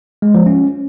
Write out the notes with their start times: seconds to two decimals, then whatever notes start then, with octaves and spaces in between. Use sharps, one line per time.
0.22 G#3
0.34 F3
0.46 C#4